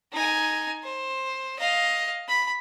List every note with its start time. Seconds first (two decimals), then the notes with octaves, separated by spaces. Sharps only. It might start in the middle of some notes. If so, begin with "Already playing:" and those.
0.12 D#4 G#5
0.84 C5
1.59 D#5 F5
2.28 B5